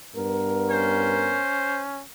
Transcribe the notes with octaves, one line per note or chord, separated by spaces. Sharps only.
G2 B3 A#4
C#4 C5